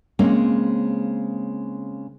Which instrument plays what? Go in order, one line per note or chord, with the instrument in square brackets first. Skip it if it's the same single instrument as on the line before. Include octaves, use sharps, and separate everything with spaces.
[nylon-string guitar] C#3 G#3 A#3 C4 C#4